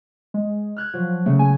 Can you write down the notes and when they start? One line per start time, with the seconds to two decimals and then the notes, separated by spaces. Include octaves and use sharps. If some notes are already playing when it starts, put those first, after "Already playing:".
0.34 G#3
0.76 F6 F#6 G#6
0.94 F3 F#3
1.26 C#3 A3
1.39 G#5